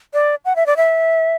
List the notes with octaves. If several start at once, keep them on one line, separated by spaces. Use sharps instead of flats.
D5
F#5
E5
D5
E5